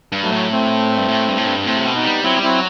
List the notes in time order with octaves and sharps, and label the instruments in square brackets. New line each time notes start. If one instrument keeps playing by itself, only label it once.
[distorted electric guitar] G2
[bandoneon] F#3 A3
[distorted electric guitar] A2
[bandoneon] A3 C4
[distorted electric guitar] G2
A2
G2
A2
G2
[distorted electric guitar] A2 [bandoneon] A3 C4
[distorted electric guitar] C3
B2
[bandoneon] B3 D#4
[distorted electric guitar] G3
[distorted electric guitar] F#3 [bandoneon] C4 E4
[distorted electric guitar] G3
[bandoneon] C4 E4
[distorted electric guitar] F#3